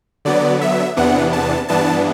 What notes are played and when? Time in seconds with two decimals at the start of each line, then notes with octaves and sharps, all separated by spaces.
0.25 D3 F#3 B3 D5
0.61 E5
0.97 E2 C3 E3 B3 D4 F#5
1.33 A5
1.68 G2 E3 B3 D4 A5